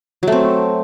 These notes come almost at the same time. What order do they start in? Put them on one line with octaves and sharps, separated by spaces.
F#3 A3 C4